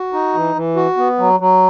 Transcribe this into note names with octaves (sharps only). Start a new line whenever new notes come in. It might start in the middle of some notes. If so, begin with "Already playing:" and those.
Already playing: F#4
D#4
E3
E3
F#4
B3
F#3
F#3